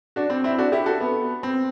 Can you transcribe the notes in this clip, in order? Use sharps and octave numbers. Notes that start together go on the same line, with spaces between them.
D4 F#4
C4
C4 E4
D4 F#4
E4 G4
F#4 A4
B3
C4